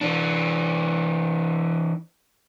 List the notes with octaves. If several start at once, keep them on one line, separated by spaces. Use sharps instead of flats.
E3 D4